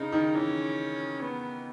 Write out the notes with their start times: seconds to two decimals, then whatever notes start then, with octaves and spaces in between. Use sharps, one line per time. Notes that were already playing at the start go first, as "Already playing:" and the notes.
Already playing: C#3 D#4
0.12 D#3
0.33 E3 C#4
1.21 B3